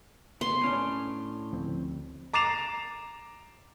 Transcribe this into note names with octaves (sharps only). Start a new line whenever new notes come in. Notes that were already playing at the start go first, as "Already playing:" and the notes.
B3 C6
A2 C#4 D4
D2 F3 C4
A#5 D6 A6 C7 E7 F7